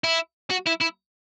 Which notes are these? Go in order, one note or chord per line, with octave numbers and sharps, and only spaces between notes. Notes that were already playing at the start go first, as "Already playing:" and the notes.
E4
F#4
E4
E4